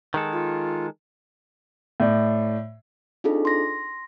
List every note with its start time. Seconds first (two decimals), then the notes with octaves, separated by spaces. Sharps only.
0.14 D#3 G#3 A4
0.33 F4
2.00 A2 D5
3.24 C4 D4 D#4 F4 G#4 A4
3.45 C6 A#6